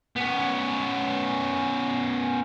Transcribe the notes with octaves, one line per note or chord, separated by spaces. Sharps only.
B3 C#4